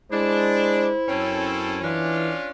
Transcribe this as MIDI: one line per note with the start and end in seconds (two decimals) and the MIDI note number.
0.12 0.94 56
0.12 0.86 62
0.12 2.10 64
0.12 1.28 72
1.09 1.98 42
1.09 1.78 60
1.09 1.78 61
1.09 1.78 69
1.82 2.34 52
1.82 2.50 61
1.82 2.50 62
1.82 2.50 65